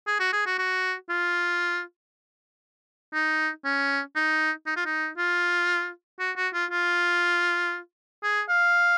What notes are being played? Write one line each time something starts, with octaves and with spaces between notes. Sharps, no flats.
G#4
F#4
G#4
F#4
F#4
F4
D#4
C#4
D#4
D#4
F4
D#4
F4
F#4
F#4
F4
F4
G#4
F5